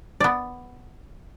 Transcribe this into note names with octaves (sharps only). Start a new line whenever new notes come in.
B3 D5